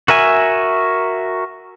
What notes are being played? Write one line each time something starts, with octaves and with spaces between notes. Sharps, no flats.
F#4 A#4 E5 G#5